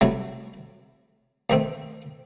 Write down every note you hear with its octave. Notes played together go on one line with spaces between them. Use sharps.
C2 C3 F#3 A3 E4
D#2 D#3 A3 C4